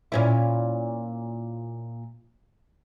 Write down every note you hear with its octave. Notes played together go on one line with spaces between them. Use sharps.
A#2 C#4 E4